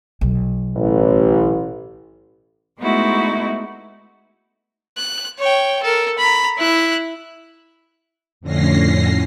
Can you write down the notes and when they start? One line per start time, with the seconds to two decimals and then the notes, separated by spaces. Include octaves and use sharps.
0.21 B1
0.76 A1
2.79 G#3 A3 B3 D#4 E4 F#4
4.97 F#6
5.39 C#5 G5
5.83 A4 A#4
6.19 A#5 B5
6.58 E4 F#6
8.41 F2 A2 D3 C#4 A#6 C7